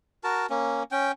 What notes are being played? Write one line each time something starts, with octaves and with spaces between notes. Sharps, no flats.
F#4 A#4 A5
A#3 C#4
C#4 G5